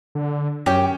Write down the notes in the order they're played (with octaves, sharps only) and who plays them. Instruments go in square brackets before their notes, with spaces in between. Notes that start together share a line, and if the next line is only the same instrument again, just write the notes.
[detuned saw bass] D3
[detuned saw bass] F#2 [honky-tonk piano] C#4 [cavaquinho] G4 G5